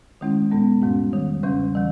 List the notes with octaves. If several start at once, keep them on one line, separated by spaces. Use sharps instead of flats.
D#3 G#3 C#4 E4
E2 B2 G#3 B3
G#2 G3 C#4
E2 D#3 G3
E2 C#3 G3 C#4
E3 G3